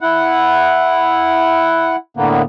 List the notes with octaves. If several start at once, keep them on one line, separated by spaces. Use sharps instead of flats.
E4 F#5
A2 D3 A#3 B3